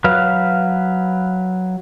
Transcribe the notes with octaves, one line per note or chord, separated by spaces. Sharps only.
F#3 B4 F5